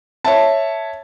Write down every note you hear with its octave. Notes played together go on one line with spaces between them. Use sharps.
C#5 E5 A5